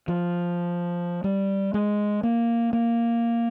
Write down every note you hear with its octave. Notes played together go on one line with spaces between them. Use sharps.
F3
G3
G#3
A#3
A#3